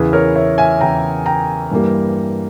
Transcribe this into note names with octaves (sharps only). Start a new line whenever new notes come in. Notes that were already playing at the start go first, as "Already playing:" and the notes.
Already playing: E2 C#3 E3 G#4 B4
A#4 C#5
C#5 E5
E5 G#5
E2 C#3 E3 G5 A#5
G5 A#5
G2 E3 G3 A#3